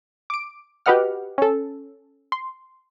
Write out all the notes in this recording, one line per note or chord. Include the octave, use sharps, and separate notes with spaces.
D6 D7
F#4 G4 B4 D#5 F#5 F6
C#4 A4
C6